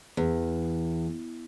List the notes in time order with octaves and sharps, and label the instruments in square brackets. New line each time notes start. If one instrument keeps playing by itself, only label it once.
[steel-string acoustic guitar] E2